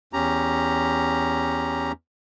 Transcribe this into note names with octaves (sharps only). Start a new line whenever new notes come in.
E2 C#4 G4 A#5